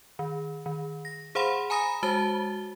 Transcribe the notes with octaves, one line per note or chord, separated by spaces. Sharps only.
D#3
D#3
A#6
G#4 C5 F5 F#5 B5 C6
G#5 A#5 B5 D#6 A#6
G#3 F#4 C5 A5 A6 G7